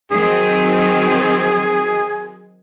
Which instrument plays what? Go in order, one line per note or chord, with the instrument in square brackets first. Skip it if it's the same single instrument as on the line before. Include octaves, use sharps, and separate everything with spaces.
[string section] D#3 F#3 C4 [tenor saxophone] G#4